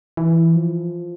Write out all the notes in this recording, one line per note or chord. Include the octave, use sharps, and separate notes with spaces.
E3
F3